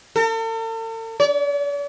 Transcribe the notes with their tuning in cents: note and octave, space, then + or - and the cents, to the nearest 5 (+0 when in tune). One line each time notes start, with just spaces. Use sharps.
A4 +45
D5 -45